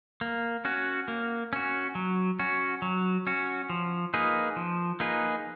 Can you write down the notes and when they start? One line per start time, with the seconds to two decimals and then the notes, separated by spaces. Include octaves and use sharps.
0.21 A#3
0.65 C#4 F#4
1.08 A#3
1.53 C#4 F#4
1.95 F#3
2.39 C#4 F#4
2.82 F#3
3.27 C#4 F#4
3.70 F3
4.14 A#3 D#4 G#4 B4
4.56 F3
5.00 A#3 D#4 G#4 B4